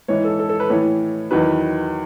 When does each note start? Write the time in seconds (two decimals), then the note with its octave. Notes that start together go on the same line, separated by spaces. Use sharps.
0.08 G#2 E3 C#5
0.24 A4
0.39 A4
0.49 A4
0.60 B4
0.70 A2 E3 C#5
1.31 E2 D#3 F#3 B4